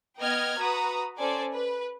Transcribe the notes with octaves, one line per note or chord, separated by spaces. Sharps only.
B3 D#5 G5 F6 G#6
F#4 B4 A#5 D#6
C#4 A4 C5 D5 G#5
B4